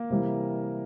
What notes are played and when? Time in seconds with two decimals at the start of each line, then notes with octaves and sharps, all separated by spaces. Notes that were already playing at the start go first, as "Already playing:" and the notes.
Already playing: A#3 A#4
0.10 C3 E3 G3